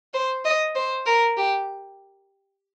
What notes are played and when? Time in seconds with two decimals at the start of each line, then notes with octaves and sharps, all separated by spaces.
0.14 C5
0.45 D#5
0.75 C5
1.06 A#4
1.37 G4